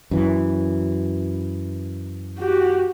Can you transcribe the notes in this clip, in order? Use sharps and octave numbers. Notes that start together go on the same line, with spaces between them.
F#2 E3
F#4 G4